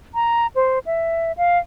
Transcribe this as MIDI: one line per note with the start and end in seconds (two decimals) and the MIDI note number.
0.14 0.47 82
0.55 0.79 72
0.86 1.32 76
1.37 1.58 77